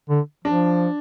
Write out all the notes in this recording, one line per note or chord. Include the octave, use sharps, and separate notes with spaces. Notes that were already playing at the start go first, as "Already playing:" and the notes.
D3
F3 D4